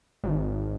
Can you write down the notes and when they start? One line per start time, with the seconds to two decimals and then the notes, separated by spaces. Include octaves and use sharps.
0.23 G#1